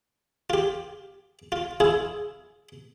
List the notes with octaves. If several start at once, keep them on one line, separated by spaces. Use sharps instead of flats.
F4 G4
F4
E4 F4 G#4